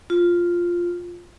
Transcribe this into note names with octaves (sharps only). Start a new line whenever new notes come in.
F4